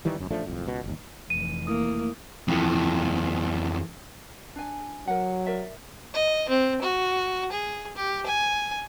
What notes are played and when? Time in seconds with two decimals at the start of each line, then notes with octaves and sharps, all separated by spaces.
0.05 D#3 E3 G3
0.16 G1 F#2
0.31 A1 F3 A3 D4
0.46 D1 C2 F2
0.66 C#2 B2
0.84 G1 D#2
1.30 F1 E3 D#7
1.67 A3 A#3 E4 D#6
2.48 F2 E3
4.56 D4 G#5
5.07 F#3 A#4 F#5
5.46 A#4 D5 E5
6.13 D#5
6.49 C4
6.82 F#4
7.52 G#4
7.96 G4
8.26 G#5